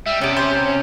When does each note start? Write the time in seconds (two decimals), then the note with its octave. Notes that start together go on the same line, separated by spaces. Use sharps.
0.06 G3 E5
0.21 C3 B3 C#4 G4
0.37 C5
0.66 C#4